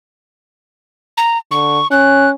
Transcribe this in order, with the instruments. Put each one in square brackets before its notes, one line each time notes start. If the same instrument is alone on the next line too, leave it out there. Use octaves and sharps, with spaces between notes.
[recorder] A#5
[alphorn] D3 [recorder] C#6
[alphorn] C#4 [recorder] F#6